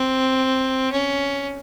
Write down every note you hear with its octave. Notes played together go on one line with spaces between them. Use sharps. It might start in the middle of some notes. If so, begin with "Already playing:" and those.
Already playing: C4
C#4